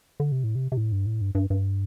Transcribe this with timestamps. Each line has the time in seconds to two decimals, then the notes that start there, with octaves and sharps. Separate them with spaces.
0.20 D3
0.32 C3
0.44 A2
0.55 C3
0.72 C3
0.77 A2
0.92 G2
1.06 A2
1.21 G2
1.35 G2
1.50 G2